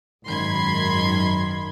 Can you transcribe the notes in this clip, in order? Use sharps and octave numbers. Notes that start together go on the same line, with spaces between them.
G#1 F#2 D#3 B5 C6 G#6